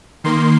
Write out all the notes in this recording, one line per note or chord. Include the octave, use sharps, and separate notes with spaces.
D#3 A#3 C6